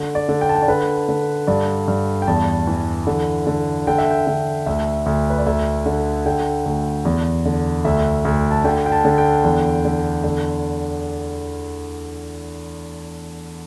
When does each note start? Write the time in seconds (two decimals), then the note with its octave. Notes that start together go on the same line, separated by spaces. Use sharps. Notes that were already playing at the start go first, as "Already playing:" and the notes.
Already playing: D3
0.15 D5
0.29 D3
0.41 G5
0.49 A5
0.55 G5
0.62 D5
0.68 D3 B4
1.09 D3
1.47 G2 D5
1.88 G2
2.22 G5
2.27 E2 A5
2.67 E3
3.07 D3
3.47 D3
3.87 D3 G5
3.98 E5
4.11 G5
4.27 D3
4.66 D2 E5
5.06 D2
5.30 B4
5.38 D5
5.46 D2 E5
5.86 D3
6.26 D3 G5
6.66 D2
7.05 E2
7.45 D3
7.85 D2 E5
8.25 D2
8.51 A5
8.64 D3 G5
8.86 G5
8.92 A5
9.05 D3
9.18 G5
9.44 E2
9.85 D3
10.24 D3